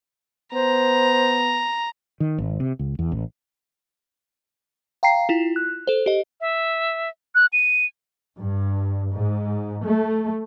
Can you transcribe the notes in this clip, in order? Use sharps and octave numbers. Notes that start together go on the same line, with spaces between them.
B3 C5 A#5
D#3
G#1
C3
C#2
E2
A1
F5 G5 A#5 C7
E4 F4
F#6
A4 C5
G4 D#5
E5
F#6
D#7
G2
G#2
A3